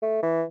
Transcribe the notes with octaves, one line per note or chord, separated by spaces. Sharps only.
A3
E3